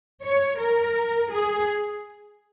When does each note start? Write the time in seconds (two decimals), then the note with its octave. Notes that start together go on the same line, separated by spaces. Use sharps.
0.23 C#5
0.59 A#4
1.32 G#4